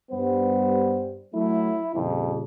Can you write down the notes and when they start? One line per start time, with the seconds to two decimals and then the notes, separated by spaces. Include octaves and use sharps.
0.11 G2 G3 B3 C5
1.34 F#3 A3 E4
1.95 F2 A#2 C#3 G3